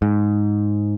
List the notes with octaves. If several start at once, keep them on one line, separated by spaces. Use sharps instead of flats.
G#2